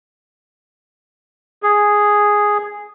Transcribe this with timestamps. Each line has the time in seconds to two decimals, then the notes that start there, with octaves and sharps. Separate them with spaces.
1.63 G#4